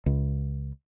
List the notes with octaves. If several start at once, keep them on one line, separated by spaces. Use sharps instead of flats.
C#2